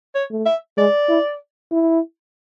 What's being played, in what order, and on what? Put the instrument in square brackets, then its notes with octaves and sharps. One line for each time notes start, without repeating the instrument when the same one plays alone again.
[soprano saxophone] C#5
[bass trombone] A3
[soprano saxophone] E5
[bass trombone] G#3 [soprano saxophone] D5
[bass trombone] E4
E4